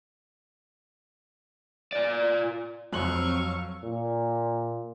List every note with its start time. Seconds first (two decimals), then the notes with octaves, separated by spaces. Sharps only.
1.92 F4 D5
2.93 F2 F#3 C4 F5 C#6 F#6 F#7
3.84 A#2